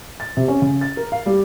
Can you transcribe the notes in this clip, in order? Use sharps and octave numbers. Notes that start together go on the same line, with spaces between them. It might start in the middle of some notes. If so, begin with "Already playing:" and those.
A6
C3
C#4
C#3
A6
A#4
F5
G3